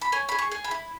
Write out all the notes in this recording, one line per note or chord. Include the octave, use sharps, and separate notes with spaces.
B5
C#4 G#5
G#4 B5
C#6
G#4
B5
E4